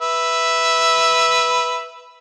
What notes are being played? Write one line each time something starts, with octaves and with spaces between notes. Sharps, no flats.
B4 E5